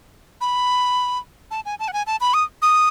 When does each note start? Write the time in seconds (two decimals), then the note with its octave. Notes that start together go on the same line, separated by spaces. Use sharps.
0.41 B5
1.51 A5
1.65 G#5
1.79 A5
1.88 F#5
1.93 G#5
2.07 A5
2.21 B5
2.34 D#6
2.62 D#6